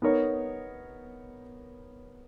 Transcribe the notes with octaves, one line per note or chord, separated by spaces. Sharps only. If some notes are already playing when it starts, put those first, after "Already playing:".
B3 D#4 A#4 C#5